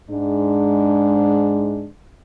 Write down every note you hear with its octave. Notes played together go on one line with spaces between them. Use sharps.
G#2 G#3 D4